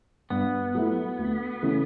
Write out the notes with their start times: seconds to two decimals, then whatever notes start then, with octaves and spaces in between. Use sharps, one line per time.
0.30 G2 B3
0.75 F#3 A3 E4
1.19 D2
1.62 C#3 E3 A3 C#4